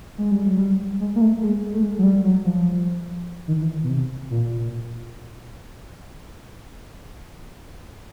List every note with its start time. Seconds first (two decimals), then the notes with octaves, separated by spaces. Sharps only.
0.18 G#3
0.31 G3
0.45 F#3
0.58 G3
1.00 G#3
1.15 A#3
1.21 A3
1.42 G#3
1.73 A3
1.83 G#3
1.98 F#3
2.03 G3
2.24 F#3
2.45 F3
3.48 D#3
3.61 E3
3.84 B2
3.89 C3
4.30 A#2